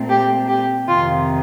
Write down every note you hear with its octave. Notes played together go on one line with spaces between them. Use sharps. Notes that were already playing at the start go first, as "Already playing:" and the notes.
Already playing: A#2 A3 C4
G4
G4
F2 C3 D#3 F4